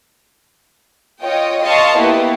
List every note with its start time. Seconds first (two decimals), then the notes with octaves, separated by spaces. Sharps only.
1.22 F4 C#5 D#5 G5
1.62 D#5 F5 A5 C6 C#6
1.96 A#3 B3 E4 G4 B4